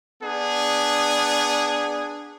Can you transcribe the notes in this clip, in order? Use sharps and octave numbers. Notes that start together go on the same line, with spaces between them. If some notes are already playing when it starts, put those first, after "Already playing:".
B3 D4 G#4